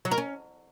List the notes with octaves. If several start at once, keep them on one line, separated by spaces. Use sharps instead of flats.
F#3
A#4
C#4